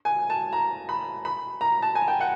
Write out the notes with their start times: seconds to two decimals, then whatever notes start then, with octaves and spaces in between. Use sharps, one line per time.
0.05 G#5
0.30 A5
0.53 A#5
0.89 B5
1.25 B5
1.61 A#5
1.82 A5
1.95 G#5
2.08 G5
2.21 F#5